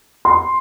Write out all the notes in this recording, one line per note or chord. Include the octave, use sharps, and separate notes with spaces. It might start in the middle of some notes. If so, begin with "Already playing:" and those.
C6